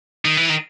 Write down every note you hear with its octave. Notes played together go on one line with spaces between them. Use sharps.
D#3
E3
D#3